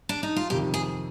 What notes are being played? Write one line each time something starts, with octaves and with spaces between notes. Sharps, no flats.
D4
D#4
F4
F2 C3 D#3 G4
G#4